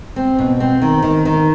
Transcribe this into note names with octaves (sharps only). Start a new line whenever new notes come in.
C4
B2
C4
D#3
D#3
D#3